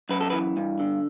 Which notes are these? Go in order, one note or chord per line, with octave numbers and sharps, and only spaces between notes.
F#2 B4
A4
E3 B4
G2
D3